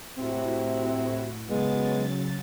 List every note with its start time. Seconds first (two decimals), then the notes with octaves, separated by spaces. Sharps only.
0.17 A2 C3 C4 E4 F#4
1.50 C#3 F#3 G#3 B3 A6